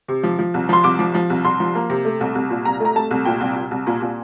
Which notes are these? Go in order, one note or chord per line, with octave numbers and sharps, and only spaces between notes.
C3
F3
F3
C2
F3 C6
C2 D6
F3
F3
C2
C2 C6
F3
A#3
C3
A3
C2
C2
A#2
C2 A#5
A3 A#5
A3 A5
C2
A#2 G5
C2
C2
C2
A#2
A#2